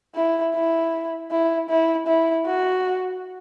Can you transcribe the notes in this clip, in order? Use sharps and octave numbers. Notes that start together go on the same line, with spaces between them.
E4
E4
E4
E4
E4
F#4